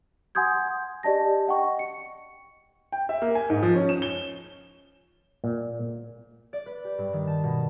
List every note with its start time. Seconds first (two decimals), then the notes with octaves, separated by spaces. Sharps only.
0.35 F#5 G#5 C6 D#6 G6 G#6
1.03 G4 D5 D#5 A5 A#6
1.47 D#5 F#5 G5 C#6
1.79 C#7
2.92 G5
3.09 E5
3.22 A#3
3.35 G#5
3.50 G#2
3.63 F3
3.75 C#4
3.89 E7
4.02 G7
5.44 A#2
6.53 D5
6.66 B4
6.85 G4
6.98 G2
7.13 D#3
7.27 A5
7.44 B2